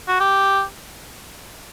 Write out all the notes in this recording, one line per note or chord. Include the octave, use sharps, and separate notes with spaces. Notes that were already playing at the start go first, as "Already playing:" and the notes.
F#4
G4